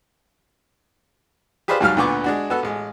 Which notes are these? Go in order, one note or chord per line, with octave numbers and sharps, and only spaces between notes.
G4 G#4 B4 C5 D5 F5
D#2 G#2 F#3 G3 F5 F6
D2 A#2 D3 B3 C#6 D6
G#3 D4 F#4
B3 F#4 A4
A1 G#3